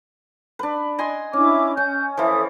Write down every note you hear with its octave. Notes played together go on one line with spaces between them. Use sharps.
D4 B4
D#5 G#5 C6
C#4 D4 E4 D6
C#4 G6
E3 F3 A4 E5 D#6